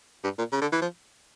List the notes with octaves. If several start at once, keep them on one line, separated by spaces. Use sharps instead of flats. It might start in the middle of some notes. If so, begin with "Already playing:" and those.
G2
A#2
C#3
D3
E3
F3